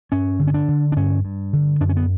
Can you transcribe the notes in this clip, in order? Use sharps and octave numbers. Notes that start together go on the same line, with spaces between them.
G2 C#4
D3
C#4
D4
D3
D4
G2 C#4
G2
D3
F#2 D4
C#4
B3